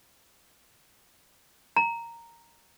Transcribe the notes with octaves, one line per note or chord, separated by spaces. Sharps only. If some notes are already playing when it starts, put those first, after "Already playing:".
A#5